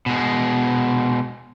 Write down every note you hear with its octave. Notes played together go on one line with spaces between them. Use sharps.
B2 G#3